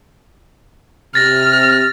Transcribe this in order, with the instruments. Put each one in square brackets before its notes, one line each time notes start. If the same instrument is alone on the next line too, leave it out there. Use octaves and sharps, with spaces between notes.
[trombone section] C3 [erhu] F6 [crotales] A6 A#6